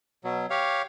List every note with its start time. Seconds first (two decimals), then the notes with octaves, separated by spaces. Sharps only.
0.24 B2 F#3
0.50 G4 C#5 F5